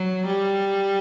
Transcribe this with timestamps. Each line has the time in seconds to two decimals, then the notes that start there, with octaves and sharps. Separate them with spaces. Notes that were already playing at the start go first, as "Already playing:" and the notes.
Already playing: F#3
0.26 G3